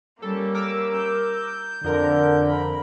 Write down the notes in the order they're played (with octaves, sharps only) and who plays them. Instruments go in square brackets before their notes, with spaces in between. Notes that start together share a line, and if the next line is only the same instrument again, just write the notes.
[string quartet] G3 A#3 C#4 [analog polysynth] A4
[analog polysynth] A#4 D6 E6
[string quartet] G6
[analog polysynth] F2 A#4 [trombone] D3
[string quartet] B5